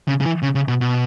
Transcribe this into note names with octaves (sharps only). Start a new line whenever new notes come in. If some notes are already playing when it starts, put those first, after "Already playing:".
C#3
C#3
E3
C#3
C#3
B2
B2